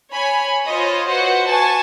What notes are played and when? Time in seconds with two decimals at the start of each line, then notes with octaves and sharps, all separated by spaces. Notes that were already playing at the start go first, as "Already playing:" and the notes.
0.12 C#5 G#5 B5
0.65 F4 C5 C#5 D#5
1.08 F#4 B4 C5 F#5
1.48 G#5 A5 C#6